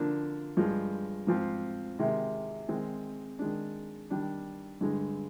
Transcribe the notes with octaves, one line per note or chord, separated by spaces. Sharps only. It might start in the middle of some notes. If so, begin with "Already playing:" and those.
Already playing: D3 F3 A#3 D4
G2 F3 G#3
G#2 F3 C4
C3 D#3 G#3
D#3 G#3 C4
D#3 G#3 D4
D#3 G3 D4
G2 D3 G#3